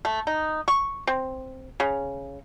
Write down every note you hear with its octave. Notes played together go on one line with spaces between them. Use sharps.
A3
D#4
C#6
C4
C#3